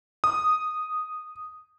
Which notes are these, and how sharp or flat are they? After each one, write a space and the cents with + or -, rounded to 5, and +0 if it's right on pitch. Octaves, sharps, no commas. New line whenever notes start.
D#6 -5